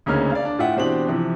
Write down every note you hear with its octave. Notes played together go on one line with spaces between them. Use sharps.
D2 C#3 A#3 C#4 D#4 F6
D5 F5
D4
A2 F4 E5 F#5 G5
B2 E3 C4 D4 G4 F#7
C3 E3 F3